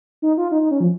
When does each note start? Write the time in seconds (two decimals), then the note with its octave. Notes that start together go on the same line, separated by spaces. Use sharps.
0.22 D#4
0.37 F4
0.51 D#4
0.62 D#4
0.71 C#4
0.80 F3